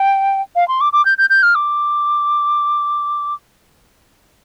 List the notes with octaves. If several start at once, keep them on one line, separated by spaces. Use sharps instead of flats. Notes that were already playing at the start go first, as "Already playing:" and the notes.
Already playing: G5
F5
C6
D6
D6
G6
G6
G6
F6
D6